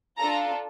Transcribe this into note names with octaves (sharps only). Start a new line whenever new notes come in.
D4 F4 A4 A#5